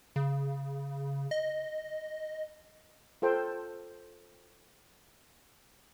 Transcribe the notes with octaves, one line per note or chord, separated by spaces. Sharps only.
C#3
D#5
F4 A4 C5 G5